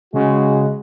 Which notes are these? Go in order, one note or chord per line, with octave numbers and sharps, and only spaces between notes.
C#3 G#3 F#4